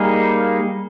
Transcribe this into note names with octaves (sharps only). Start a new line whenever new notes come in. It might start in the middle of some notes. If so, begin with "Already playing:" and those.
Already playing: G3 A#3 D#4 G#4